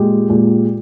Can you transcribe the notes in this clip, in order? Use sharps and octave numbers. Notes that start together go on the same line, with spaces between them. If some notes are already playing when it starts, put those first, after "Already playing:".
Already playing: A#2 G#3 G4
A#2 G#3